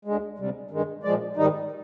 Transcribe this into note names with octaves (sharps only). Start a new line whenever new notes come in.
D2 D3 G#3
D2 C3 G3
G2 D#3 G#3
A#2 F3 G#3 D5
G#2 D#3 G3 D#4